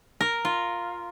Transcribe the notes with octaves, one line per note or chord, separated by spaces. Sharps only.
A#4
F4